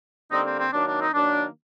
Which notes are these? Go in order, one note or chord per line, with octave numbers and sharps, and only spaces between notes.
D3 G3 A#3 C4 D#4
C4
C4
D#3 F#3 A#3 D4
D4
C4 D#4
D#3 F#3 A#3 D4